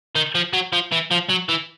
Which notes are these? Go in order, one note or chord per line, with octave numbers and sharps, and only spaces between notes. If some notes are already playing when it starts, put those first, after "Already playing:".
D#3
F3
F#3
F3
E3
F3
F#3
E3